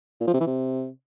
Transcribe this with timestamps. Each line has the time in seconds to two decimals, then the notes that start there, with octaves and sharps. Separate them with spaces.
0.21 A#2
0.27 F3
0.34 C3
0.40 E3
0.47 C3